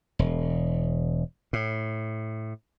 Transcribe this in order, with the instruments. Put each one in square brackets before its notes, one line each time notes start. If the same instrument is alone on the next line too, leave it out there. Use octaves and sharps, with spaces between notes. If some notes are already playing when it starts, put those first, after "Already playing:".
[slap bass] E1
A2